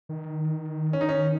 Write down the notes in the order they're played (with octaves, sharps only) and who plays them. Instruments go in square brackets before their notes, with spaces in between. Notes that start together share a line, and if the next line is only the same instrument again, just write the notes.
[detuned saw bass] D#3
[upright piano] C#4
D#4
C#4